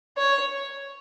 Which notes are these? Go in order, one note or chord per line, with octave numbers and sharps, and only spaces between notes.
C#5